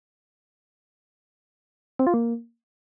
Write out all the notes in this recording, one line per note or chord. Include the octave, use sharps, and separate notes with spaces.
C4
F4
A#3